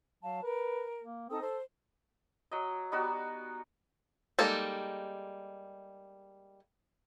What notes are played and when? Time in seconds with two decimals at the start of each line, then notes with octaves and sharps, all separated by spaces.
0.23 F#3 F5 A5
0.42 A#4 B4
1.02 A#3
1.29 C4 D#4 A4 D#6
1.42 A4 C5
2.51 F#3 D#5
2.92 G3 B3 D#4 F#4
4.39 G3 G#3 A#3 D#4 A4